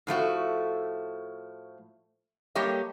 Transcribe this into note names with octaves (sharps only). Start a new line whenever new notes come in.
A2 F3 A3 F#4
G3 A3 A#3 G4 C#5 D#5